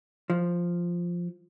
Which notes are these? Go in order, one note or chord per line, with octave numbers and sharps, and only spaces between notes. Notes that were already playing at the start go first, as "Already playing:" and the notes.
F3